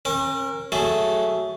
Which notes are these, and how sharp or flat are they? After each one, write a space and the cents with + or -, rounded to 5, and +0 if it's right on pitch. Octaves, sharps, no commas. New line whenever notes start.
C#4 -40 A#4 +0
F#3 +15 A3 +0 G#4 +0